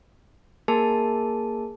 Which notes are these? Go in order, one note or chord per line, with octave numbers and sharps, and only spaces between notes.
A#3 G#4 A#4 A5